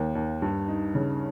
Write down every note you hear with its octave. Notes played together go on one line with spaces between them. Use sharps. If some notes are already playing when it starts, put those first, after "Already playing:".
Already playing: D#2 A#3
D#2
G2
D#4
C#3